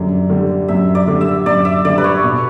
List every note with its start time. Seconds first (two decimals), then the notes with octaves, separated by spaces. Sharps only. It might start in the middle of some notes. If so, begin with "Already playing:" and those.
Already playing: F#2 D3 G3 D5
0.30 D3 G3
0.68 F#2 E5
0.95 D5
1.07 D3 G3
1.21 E5
1.46 F#2 D5
1.65 E5
1.85 D3 G3 D5
1.98 B4
2.04 C#5
2.23 B2